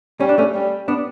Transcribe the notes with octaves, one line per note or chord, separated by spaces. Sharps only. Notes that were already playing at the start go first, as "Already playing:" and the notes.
G3 C#4
D4
A3 C#4
G3
B3 D4